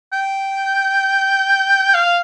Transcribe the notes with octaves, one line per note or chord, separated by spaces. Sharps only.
G5
F5